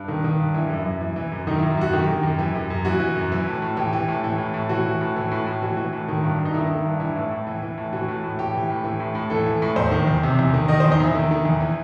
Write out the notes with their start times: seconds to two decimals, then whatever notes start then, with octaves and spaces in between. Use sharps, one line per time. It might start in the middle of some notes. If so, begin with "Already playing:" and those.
Already playing: G2 B4
0.08 D#3
0.24 D#3
0.40 G2
0.54 E3 E4
0.70 F#2
0.85 F#2
1.01 E3
1.16 E3
1.32 F#2
1.47 D#3 D#4
1.58 E4
1.62 F#2
1.70 E4
1.77 F#2 F#4
1.93 D#3 G4
2.08 D#3
2.23 F#2
2.39 E3
2.55 F#2
2.70 F#2
2.85 E3 F#4
3.00 E3
3.15 F#2
3.32 E3
3.47 A2
3.62 A2
3.77 E3 G4
3.93 E3
4.08 A2
4.24 E3
4.38 A2
4.54 A2
4.69 E3 F#4
4.85 E3
5.01 A2
5.16 E3
5.31 A2
5.46 A2
5.62 E3 F#4
5.77 E3
5.93 A2
6.08 D#3
6.24 G2
6.39 G2
6.45 D#4
6.54 D#3 E4
6.70 D#3
6.85 G2
7.00 E3 E4
7.15 A2
7.31 A2
7.47 E3
7.62 E3
7.78 A2
7.93 E3 F#4
8.08 A2
8.24 A2
8.38 E3 G4
8.54 E3
8.70 A2
8.84 E3
9.00 A2
9.15 A2
9.30 E3 A4
9.46 E3
9.62 A2
9.76 E2 C5
9.91 D#3
10.07 E2
10.23 C3
10.39 E2
10.54 D#3
10.68 D#3 D#5
10.80 E2 C5
10.92 D#4
11.00 E2 E4
11.15 D#3
11.31 D#3
11.45 E2
11.61 E3